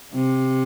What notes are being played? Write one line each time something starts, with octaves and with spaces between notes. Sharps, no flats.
C3